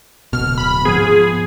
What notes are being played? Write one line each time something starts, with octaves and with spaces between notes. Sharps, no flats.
D1 G1 B2 F6
B5
G#2 F3 B3 G#4